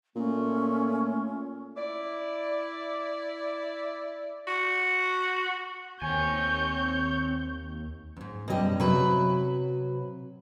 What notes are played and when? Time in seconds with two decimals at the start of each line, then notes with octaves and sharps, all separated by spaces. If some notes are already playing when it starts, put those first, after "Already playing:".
0.16 A#2 A3 C#4
1.77 E4 D5
4.47 F#4
6.02 D#2 C4 C#5 G#5 G6
8.17 F2 G#2
8.48 F#2 B2 G3 G4 D#5
8.80 C3 F#3 B4